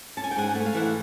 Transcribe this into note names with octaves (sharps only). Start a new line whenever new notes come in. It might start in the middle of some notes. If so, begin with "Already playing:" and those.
C#4 A5
G#5
G5
G#2 F#5 G#5
A3 F#5
F5
E3 E5 F#5